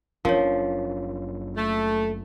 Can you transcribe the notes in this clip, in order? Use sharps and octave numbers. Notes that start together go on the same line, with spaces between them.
F#1 F3 C#4 D4 A#4 C#5
A3